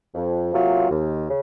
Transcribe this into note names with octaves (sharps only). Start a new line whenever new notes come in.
F2
C3 F#3 A#3 F4
D#2
C#3